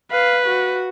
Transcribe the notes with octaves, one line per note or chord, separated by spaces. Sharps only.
B4 F5
F#4